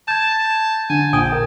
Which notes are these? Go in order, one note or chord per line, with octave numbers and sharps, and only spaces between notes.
A5 G6 G#6
D3 G#5
A#1 G5 G#5 D#6 G#6
A#4